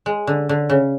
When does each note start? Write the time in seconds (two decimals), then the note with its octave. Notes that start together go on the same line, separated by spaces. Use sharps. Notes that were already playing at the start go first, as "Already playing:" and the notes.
0.06 G#3
0.27 D3
0.49 D3
0.69 C#3